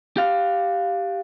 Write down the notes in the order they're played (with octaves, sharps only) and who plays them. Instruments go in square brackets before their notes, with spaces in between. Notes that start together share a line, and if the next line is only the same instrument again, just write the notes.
[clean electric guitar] G4 F5